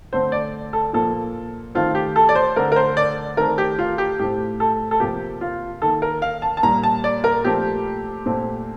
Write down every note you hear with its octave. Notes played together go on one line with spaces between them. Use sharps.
D3 A3 C4 C5
D5
A4
A#2 F3 A#3 A4
D#3 A3 C4 F4
G4
A4
D5
C5
D3 A3 C4 A#4
A#4
C5
D5
D#3 A3 C4 A#4
G4
F4
G4
A2 A3 C4 G4
A4
A4
C3 F3 A#3 G4
F4
D#3 A#3 A4
A#4
F5
A5
A5
A#2 G3 A#3 A#5
A5
D5
A#4
A#2 F3 A3 C4 G4
A#2 A3 C4